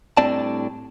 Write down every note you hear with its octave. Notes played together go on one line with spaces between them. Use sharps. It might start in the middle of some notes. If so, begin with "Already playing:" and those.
A2 G3 C4 D4 D5 A5